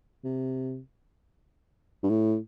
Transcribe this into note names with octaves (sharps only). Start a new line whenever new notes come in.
C3
G2
A2